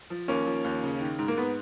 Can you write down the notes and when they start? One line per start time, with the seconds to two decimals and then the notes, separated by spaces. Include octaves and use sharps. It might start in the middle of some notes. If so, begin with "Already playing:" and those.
0.10 F3
0.28 D#2 A#3 C#4
0.46 F3
0.64 D#2
0.84 C#3
1.01 D#3
1.19 G#2
1.28 A#3
1.37 G#2 B3